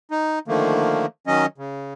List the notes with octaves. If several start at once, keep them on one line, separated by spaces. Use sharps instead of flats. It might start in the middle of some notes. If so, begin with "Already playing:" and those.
D#4
D3 D#3 F3 A3 A#3
D#3 F#3 C#4 D#5
C#3